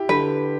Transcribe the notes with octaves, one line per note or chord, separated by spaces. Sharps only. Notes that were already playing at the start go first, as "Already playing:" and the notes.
Already playing: E4 G4
D3 B4